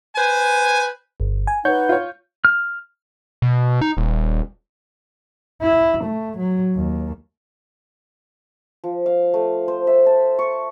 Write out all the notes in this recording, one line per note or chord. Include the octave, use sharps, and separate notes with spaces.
B4 C5 G#5
G1
G#5
D#4 B4 C#5 F#5 G6
F4 C#5
F6
B2
D#4
D#1
E4
A3
F#3
D#2
F3
F5
A3
C5
E5
A5
C#6